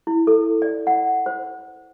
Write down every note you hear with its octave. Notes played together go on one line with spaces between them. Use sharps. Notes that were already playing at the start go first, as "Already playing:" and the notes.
E4
A4
D5
F#5
C5